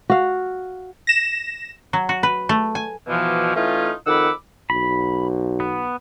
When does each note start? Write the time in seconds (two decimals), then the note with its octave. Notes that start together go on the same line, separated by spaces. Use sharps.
0.10 F#4 F5
1.07 A#6 E7
1.93 F#3
2.09 F#4
2.23 B4
2.49 A3
2.75 G#5
3.07 B2 E3 F3
3.55 E3 A3 C#4 D#4 F4
4.06 F2 D#3 F#5 B5 D6 E6
4.70 B1 B5
5.60 B3